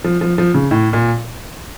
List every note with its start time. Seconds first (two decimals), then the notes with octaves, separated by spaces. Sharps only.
0.04 F3
0.21 F3
0.38 F3
0.54 C#3
0.71 A2
0.93 A#2